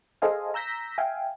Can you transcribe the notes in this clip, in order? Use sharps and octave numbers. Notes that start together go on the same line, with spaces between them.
G#4 A4 C5 D#5 F5 G#5
A#5 E6 G6 A#6 B6
E5 F5 G5 G#5